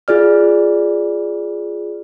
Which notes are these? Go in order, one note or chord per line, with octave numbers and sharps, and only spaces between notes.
F4 G#4 D5 F6